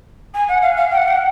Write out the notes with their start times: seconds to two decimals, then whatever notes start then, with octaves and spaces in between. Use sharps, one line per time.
0.34 G#5
0.48 F#5
0.62 F5
0.76 F5
0.91 G5
0.97 F#5
1.07 G5